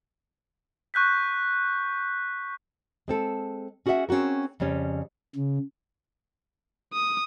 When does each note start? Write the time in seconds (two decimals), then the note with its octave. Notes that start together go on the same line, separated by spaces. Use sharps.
0.94 C#6 F#6 G6 B6
3.08 G#3 C4 A4
3.86 C#4 F#4 G#4 C#5 E5 F#5
4.09 C4 C#4 F4 F#4 A#4
4.60 F2 C#3 G3 C#4
5.36 C#3
6.93 D#6